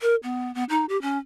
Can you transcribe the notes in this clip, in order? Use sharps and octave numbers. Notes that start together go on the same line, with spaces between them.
A#4
B3
B3
D#4
G4
C#4